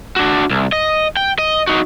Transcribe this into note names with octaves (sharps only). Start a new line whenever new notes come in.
D4 F#4
C2
D#5
G5
D#5
D#4 F#4